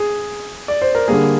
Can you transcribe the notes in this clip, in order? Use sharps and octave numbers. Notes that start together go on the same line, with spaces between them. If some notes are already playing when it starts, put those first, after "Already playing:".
Already playing: G#4
D5
C5
A#4
D3 G3 A#3 G#4